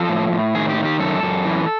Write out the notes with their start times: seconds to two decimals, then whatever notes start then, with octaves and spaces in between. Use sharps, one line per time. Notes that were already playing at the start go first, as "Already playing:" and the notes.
Already playing: F3 A4
0.09 A2
0.32 A2
0.55 D#3 G#4
0.69 G4
0.77 D#3
0.85 G4
1.00 F#2 A4
1.23 F#2
1.45 E3